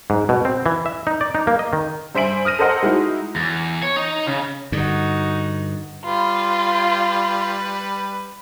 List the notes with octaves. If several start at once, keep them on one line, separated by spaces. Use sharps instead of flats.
G#2
B2
C4
E3
E5
D#4
D5
D#4
A#3
D#5
D#3
G2 C5 E5 G#5 D7 F#7
D#6 F6 A#6 D#7
A4 A#4 C5 D#5 F#5
G#3 D#4 E4 F#4
E2
C#5
D#4
C#3
G2 D3 D#4 F#4
G3 F4 B4